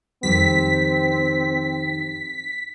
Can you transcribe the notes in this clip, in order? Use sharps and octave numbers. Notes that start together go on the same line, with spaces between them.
F2 D#3 G3 C4 B6